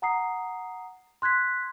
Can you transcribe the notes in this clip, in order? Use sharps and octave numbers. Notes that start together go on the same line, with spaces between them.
F#5 A#5 D#6 C7
C6 F#6 G#6 B6